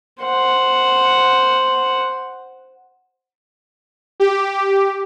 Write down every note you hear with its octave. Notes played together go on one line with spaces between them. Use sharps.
C5 F#5
G4